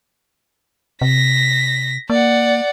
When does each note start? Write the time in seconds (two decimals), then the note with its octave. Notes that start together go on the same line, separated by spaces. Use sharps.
1.01 C3 A#6 B6
2.10 A#3 D5 F#5